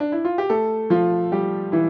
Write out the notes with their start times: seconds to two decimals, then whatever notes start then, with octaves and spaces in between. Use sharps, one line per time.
0.00 D4
0.12 E4
0.25 F4
0.38 G4
0.50 A3 A4
0.90 F3 F4
1.32 G3 G4
1.72 E3 E4